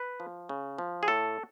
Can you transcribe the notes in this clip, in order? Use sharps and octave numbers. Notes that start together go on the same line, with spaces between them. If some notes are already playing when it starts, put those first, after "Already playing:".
Already playing: B4
F3
C#3
F3
G#4
A2 A4